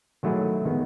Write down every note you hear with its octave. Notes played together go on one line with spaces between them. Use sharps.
D#3 F#3 A3 E4 G#4
D#3 G#3 B3